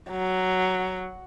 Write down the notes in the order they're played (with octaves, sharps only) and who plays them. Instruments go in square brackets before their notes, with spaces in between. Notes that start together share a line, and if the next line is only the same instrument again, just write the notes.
[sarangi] F#3